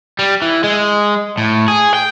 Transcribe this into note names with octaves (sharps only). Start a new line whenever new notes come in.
G3
E3
G#3
A2
G#4
G5